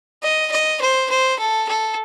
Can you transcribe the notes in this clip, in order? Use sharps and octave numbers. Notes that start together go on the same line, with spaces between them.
D#5
D#5
C5
C5
A4
A4